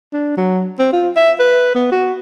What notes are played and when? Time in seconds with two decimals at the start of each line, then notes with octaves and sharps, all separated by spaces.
0.13 D4
0.37 F#3
0.79 C4
0.93 F4
1.16 E5
1.39 B4
1.75 B3
1.92 F#4